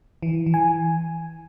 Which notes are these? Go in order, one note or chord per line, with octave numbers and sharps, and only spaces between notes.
E3
E3
G#5